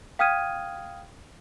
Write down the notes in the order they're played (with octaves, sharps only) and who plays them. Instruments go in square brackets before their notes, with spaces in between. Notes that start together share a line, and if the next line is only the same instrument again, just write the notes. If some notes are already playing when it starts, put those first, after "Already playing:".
[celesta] F5 G5 D#6 F6 G#6 D#7